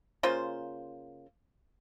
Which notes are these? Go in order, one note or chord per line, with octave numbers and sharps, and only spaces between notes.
C#3 A#3 F4 C5